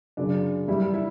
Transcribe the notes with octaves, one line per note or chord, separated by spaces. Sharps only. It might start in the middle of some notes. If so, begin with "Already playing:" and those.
F#2 C#3 F#3 D4
G2 E3 G3 E4
E4